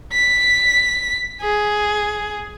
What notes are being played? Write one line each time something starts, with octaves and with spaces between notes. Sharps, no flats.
B6
G#4